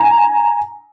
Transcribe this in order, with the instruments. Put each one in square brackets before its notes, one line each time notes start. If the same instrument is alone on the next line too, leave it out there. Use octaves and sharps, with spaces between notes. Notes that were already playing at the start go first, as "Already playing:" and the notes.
Already playing: [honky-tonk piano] G#5 A#5